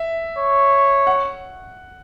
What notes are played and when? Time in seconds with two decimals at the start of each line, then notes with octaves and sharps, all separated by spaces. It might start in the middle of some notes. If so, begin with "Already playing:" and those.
Already playing: E5
0.38 C#5
1.07 F#5